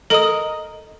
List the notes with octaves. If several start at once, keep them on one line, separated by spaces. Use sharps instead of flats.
A4 A#4 D#5 D#6